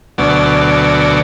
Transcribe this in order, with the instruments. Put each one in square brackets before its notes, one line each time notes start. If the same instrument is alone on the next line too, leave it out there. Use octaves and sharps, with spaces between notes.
[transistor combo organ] D2 B2 F#3 D5